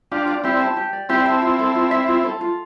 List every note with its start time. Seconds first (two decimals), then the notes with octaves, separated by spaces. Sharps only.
0.11 D4 F4 G4
0.27 D5
0.44 C4 E4 G4
0.60 A5
0.77 G4
0.93 D5
1.09 C4 E4 G4
1.26 A5
1.42 F4
1.59 A4
1.75 F4
1.91 E5
2.08 F4
2.24 A4
2.41 F4